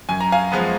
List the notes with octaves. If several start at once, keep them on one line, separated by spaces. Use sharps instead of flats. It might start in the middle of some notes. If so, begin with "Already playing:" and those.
F#2 G#5
A#5
F5 G#5
F3 G#3 B3